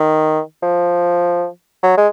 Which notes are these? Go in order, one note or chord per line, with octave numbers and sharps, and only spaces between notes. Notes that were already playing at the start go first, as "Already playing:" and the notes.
Already playing: D#3
F3
F#3
G#3